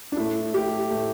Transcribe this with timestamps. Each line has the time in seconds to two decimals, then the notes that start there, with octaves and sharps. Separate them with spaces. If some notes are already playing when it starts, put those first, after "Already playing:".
0.12 D4
0.17 A2 A3 E4
0.54 G4
0.90 A2 A3